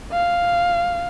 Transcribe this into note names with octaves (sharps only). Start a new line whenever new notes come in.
F5